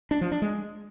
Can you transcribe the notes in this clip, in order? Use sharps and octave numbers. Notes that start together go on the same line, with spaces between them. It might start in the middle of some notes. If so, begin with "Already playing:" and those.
D4
F3
D4
G#3